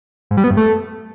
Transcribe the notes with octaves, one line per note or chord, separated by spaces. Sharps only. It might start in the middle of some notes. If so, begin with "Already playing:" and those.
G#2
G3
B3
G2
A3